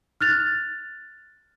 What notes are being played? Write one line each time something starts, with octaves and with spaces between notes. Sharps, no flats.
F6 F#6 A6 F7